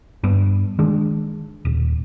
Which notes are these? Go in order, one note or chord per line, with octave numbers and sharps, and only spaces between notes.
G2 B3
D#3 G#3 D4
D#1